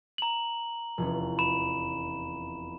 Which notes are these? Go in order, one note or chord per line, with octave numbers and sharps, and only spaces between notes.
A#5 F#7
F1 E2 C#4
B5 E7